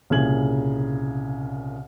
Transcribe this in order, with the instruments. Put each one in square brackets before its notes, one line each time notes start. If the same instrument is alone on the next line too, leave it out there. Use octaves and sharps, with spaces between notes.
[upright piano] C2 A#2 C#3 G#4 G#6 F#7